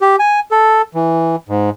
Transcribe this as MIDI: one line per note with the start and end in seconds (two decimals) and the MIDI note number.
0.01 0.16 67
0.19 0.40 80
0.51 0.82 69
0.94 1.36 52
1.49 1.70 44